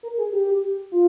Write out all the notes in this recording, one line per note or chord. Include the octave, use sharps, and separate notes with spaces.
A#4
G#4
G4
F4